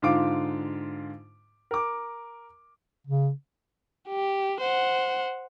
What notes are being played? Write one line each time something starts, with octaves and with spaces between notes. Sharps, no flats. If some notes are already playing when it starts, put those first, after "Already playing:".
G#2 D3 F4 F5 D6 D7
A#4 D6
C#3
G4
C5 F#5